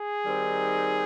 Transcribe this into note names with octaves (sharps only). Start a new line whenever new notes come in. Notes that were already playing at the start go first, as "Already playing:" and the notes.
Already playing: G#4
D#3 G3 C4 D#4